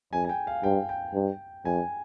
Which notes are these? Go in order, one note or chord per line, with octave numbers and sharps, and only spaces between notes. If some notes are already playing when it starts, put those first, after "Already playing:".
F2 G#5
G#5
G5
F5
G2 G5
G5
G2
F2 G#5